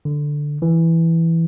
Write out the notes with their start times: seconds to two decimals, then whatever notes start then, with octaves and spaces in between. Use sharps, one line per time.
0.05 D3
0.62 E3